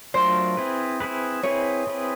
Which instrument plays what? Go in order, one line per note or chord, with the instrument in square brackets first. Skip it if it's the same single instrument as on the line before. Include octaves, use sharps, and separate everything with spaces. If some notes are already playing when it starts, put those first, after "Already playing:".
[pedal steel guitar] F#3 A3 D4 F4 A#4 [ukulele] C5
[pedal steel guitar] C4 E4 G#4 B4
C4 E4 G#4 B4
[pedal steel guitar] C4 E4 G#4 B4 [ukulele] C#5
[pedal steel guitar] C4 E4 G#4 B4